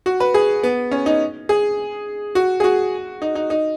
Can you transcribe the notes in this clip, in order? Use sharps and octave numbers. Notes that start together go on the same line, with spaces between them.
F#4
B4
G#4
B3
C#4
D#4
G#4
F#4
G#4
F#4
D#4
D#4
D#4